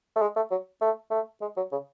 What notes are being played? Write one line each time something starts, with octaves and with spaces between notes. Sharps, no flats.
A3
G#3
A3
F#3
A3
A3
G#3
F#3
C#3